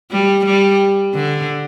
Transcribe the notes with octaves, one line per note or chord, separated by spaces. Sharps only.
G3
G3
D3